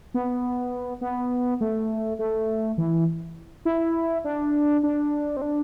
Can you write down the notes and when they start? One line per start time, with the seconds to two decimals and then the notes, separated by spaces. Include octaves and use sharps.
0.14 B3
1.01 B3
1.61 A3
2.19 A3
2.78 E3
3.65 E4
4.24 D4
4.83 D4
5.37 C4
5.42 D4